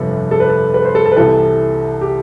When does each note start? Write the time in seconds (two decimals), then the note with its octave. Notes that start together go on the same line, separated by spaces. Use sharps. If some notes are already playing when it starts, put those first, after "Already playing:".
Already playing: G1 F2 C3 G3 A4 B4
0.31 A4
0.40 B4
0.49 A4
0.74 B4
0.85 C5
0.95 A4
1.06 A4
1.12 B4
1.16 C2 C3 E3 A4
2.01 G4